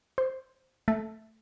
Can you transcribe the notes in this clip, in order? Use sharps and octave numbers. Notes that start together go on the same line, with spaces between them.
C5
A3